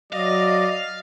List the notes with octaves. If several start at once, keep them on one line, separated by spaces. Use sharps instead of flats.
F#3 D5 D#5 F5